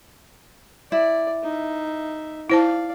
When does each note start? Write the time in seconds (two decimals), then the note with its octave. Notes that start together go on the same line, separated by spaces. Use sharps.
0.92 E4 D5
1.43 D#4 E5
2.50 E4 C5 D5 F5 A5